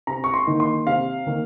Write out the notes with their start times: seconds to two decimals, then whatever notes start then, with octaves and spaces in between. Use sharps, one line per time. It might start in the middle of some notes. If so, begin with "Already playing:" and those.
0.07 C3 A#5
0.24 C#6
0.34 C6
0.47 D#3 A#3 D#4
0.60 C6
0.87 C3 F5
1.27 D#3 A#3 D#4